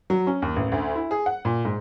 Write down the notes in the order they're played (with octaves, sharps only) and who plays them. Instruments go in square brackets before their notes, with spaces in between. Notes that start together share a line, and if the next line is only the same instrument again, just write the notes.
[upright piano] F#3
C#4
D#2
A1
D2
E4
G#4
F#5
A#2
G#2